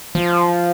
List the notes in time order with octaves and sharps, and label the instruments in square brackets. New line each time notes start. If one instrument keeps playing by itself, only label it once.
[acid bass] F3